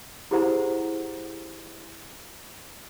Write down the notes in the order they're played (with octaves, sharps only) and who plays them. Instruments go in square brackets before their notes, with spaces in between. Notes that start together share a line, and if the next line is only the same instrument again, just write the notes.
[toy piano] E4 G4 G#4 C5 F#5 A#5